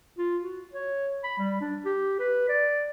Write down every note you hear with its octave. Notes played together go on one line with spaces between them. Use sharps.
F4
F#4
C#5
B5
G3
D4
G4
B4
D5